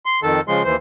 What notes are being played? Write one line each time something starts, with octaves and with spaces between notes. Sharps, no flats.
C6
F2 D#3 A4
C#3 F3 G#3 C6
D#2 E3 C5